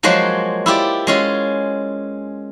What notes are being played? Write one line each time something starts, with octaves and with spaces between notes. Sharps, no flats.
F3 F#3 G#3 A#3 F#4 C5
E4 F4 G4 D5
G#3 C#4 F4